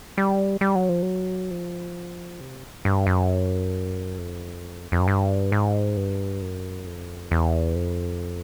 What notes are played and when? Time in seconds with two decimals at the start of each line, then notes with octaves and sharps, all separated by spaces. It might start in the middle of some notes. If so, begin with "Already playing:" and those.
0.18 G3
0.61 G3
0.75 F#3
0.89 F3
1.02 F#3
1.51 F3
2.40 C3
2.85 G2
3.07 F#2
4.18 F2
4.92 F2
5.00 F#2
5.08 G2
5.52 G#2
5.97 G2
6.42 F#2
6.86 F2
7.31 E2
7.75 F2